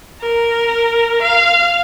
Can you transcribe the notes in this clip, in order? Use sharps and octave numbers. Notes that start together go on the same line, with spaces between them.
A#4
F5